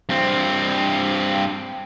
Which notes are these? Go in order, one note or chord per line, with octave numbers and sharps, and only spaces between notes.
G2 C4